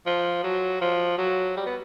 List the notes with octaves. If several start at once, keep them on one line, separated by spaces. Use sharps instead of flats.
F3
F#3
F3
F#3
G3
B3